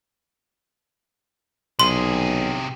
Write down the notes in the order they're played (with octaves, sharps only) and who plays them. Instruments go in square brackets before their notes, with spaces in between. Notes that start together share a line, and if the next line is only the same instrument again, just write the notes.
[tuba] B1 [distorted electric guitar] C3 G#4 [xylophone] C6